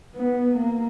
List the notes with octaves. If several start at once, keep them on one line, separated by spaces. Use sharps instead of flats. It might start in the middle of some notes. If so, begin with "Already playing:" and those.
B3
A#3